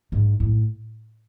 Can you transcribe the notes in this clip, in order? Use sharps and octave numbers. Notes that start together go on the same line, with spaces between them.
G#2
A2